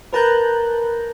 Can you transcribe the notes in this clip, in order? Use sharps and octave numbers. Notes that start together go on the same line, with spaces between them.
A#4 B4 A5 A#5 F#6 G6